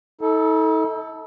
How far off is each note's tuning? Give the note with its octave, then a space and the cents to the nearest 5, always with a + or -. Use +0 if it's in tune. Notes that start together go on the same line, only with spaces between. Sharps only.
D#4 +45 A4 +0